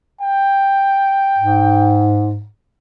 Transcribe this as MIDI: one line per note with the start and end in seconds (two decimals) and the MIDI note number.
0.21 2.09 79
1.38 2.46 44